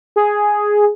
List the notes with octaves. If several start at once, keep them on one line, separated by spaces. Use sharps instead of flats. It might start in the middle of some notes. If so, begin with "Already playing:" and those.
G#4